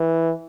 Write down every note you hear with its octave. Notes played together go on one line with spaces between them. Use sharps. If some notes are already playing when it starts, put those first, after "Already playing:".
Already playing: E3